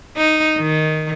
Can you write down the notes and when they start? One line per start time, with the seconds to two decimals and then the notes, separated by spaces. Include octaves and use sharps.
0.17 D#4
0.59 D#3